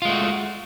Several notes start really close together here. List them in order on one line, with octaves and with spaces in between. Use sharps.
F4 G#3 A3 F#4